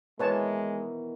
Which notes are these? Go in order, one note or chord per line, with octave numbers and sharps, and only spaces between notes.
B2 D#3 E3 G#3 B4 C#5 A5